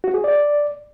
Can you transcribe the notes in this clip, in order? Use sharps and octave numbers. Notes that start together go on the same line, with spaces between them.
F#4
G#4
D5